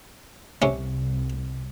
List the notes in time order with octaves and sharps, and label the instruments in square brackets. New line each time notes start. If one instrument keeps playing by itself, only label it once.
[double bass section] C2 [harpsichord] C3 C#4